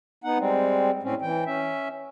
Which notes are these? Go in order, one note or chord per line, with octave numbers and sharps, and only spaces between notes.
B3 D#4 F#5
G3 G#3 C4
A2 C4 C#4
E3 G5
C#4 E5